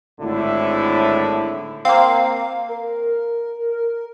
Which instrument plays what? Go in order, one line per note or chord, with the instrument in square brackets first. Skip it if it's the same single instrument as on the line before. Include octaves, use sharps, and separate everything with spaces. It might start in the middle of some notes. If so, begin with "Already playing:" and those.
[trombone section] G#1 A2 D3 E4
[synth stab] A#3 C4 [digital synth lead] F5
[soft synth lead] A#4